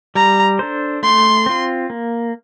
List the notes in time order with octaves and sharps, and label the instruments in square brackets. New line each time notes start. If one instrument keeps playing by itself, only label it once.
[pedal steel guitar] G3 [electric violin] A#5
[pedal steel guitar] D4 A4 C5
[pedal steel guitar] A3 [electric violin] C6
[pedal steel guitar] C4 F4
A#3